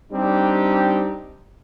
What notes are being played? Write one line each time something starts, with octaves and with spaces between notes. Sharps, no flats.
G3 C4 D4 D#4 G4